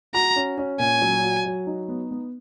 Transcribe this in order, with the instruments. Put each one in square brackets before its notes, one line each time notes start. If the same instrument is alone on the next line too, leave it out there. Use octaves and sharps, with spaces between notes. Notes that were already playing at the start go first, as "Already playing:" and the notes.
[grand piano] F#4 [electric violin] A#5
[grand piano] C#4
C#4
[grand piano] A#2 [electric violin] G#5
[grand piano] F#3
F#4
F#3
D#4
B3
B3